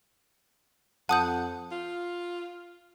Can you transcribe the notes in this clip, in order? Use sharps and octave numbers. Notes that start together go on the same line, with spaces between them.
F2 F#5 A5 D#6 G6
F4